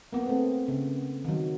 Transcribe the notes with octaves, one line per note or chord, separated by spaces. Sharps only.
A#3 B3
A3 C4
C#3
D#3 F#3